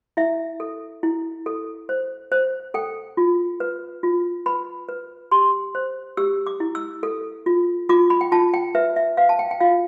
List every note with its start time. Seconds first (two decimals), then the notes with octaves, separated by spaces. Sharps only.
0.17 E4 E5
0.60 A4
1.03 E4
1.46 A4
1.89 C5
2.32 C5
2.74 A4 G5
3.17 F4
3.60 B4
4.03 F4
4.46 B4 B5
4.89 B4
5.32 G4 C6
5.75 C5
6.17 G4 E6
6.47 D6
6.60 E4
6.75 E6
7.03 A4
7.46 F4
7.89 F4 D6
8.10 B5
8.21 G5
8.32 F4 A5
8.54 G5
8.75 B4 E5
8.96 E5
9.17 B4 F5
9.29 A5
9.39 G5
9.51 G5
9.61 F4 F5